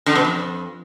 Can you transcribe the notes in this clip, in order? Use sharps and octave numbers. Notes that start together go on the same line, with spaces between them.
D3
B2
F2